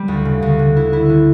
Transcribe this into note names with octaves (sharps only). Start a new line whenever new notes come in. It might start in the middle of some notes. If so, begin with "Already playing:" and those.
Already playing: G3
D2
C#3
D2
D3
E4
E4
D3